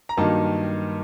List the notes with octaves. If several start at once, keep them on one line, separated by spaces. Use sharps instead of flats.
A#5
G2 D#3 F#3 A#3 D#4 A5